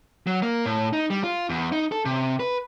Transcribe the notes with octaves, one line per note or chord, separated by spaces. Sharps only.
F#3
A#3
A2
D#4
G3
F4
E2
D#4
A4
C3
B4